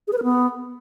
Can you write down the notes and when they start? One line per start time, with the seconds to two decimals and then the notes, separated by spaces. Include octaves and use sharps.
0.08 G#4
0.13 B4
0.18 A#4
0.23 B3